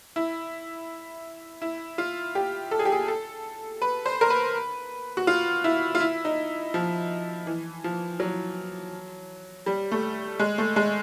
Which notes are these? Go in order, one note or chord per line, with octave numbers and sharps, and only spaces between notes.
E4
E4
F4
G4
A4
G#4
G4
G#4
A4
B4
C5
A#4
B4
F#4
F4
E4
F4
E4
D#4
F3
E3
F3
F#3
G3
A3
G#3
A3
G#3